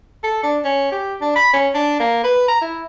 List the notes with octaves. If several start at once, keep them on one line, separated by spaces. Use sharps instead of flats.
A4
D4
C#4
G4
D4
B5
C#4
D4
A#3
B4
A#5
E4